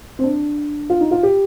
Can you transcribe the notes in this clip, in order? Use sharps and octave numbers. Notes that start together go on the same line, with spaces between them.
C4
D4
F4
D#4
F4
G4